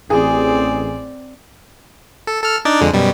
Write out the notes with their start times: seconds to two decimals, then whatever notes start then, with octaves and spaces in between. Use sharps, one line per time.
0.10 A1 C4 G#4 D5
2.27 A4
2.43 A4 F6
2.65 D4 D#4 D5
2.81 F2 D3 G#3
2.93 F#2 B2 G3